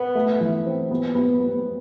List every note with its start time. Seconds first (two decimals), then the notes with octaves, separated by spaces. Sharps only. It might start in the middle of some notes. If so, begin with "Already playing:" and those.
Already playing: B3
0.15 A3
0.41 E3
0.66 C4
0.91 B3
1.15 B3
1.40 B3